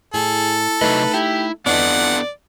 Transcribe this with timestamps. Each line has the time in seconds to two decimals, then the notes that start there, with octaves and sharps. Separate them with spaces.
0.14 A2 G#4 A4
0.81 C3 F#3 A3 D#4 B4 D#5
1.14 E4 G4
1.66 F2 E3 B3 D4 A4 D5 D#5 F#5